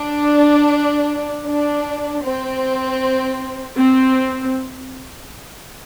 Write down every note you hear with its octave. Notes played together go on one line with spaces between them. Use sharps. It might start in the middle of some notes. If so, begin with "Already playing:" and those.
Already playing: D4
D4
C4
C4